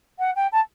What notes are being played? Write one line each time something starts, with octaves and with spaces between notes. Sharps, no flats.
F#5
G5
A5